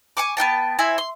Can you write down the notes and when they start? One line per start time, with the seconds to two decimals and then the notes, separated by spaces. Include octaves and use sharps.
0.17 G#5 C#6 D6
0.37 B3 D#4 G5 A5
0.79 C4 E4 E5 G#5
0.98 C6